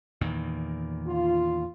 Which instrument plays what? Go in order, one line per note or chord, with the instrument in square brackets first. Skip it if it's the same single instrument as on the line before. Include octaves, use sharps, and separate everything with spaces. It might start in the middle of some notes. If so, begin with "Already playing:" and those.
[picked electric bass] E2 A#2 D#3
[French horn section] F4